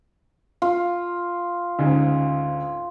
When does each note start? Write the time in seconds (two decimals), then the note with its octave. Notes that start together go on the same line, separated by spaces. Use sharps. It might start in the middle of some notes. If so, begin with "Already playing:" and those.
0.62 F4 F5
1.79 D2 G#2 C#3